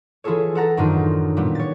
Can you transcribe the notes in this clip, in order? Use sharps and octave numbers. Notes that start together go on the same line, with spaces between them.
E3 E4 F4 G#4 A4 C#5
A4 F#5 A#5 A6
F#2 A2 D#3 D4 D#4 F4
A#2 G3 B3
C#5 A6